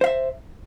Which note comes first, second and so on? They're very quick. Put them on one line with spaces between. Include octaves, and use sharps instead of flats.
C5 F5 E5